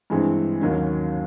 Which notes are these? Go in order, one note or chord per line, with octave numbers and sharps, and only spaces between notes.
G2 E3 G#3 C4
D#2 D#3 F#3 A#3 C#4